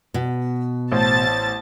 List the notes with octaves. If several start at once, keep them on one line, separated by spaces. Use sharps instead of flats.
B2
A1 C5 A5 A6